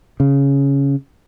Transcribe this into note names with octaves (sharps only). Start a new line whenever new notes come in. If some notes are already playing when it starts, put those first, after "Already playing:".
C#3